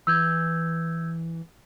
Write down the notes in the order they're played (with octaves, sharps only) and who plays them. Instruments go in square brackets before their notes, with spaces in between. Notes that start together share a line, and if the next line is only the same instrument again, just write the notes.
[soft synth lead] E3 [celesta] E6 G6 G#6